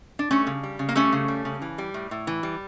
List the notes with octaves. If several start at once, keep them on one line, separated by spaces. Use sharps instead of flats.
D4
G3 A3 C#4
C#3
G3
C#3
A#3
G3 A3 C#4
C#3
G3
C#3
E3
G3
A2
A2
E3
G3